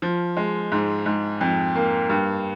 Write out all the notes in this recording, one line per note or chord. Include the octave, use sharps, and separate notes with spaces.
F3
G#3
G#2
G#2
F2
A#3
G2